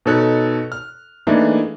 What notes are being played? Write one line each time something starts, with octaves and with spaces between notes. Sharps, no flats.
B2 D#4 A4 C#5 F#6
F6
E3 A3 A#3 D4 D#4 G#4